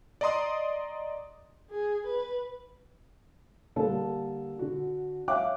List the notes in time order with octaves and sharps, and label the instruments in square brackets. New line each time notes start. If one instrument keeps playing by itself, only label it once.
[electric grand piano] D5 D#5 A#5 C6 D#6
[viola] G#4
B4
[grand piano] D3 G3 A#3 A4
D3 F#4
C#5 E5 F5 G5 D6 F#6